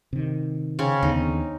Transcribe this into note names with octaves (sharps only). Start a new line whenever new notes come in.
C3 D#3
C#3 C4 C#4
D#2 D3 B3 D#4